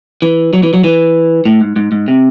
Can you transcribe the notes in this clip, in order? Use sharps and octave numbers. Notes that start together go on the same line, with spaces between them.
E3
F#3
E3
F#3
E3
A2
G#2
G#2
G#2
C3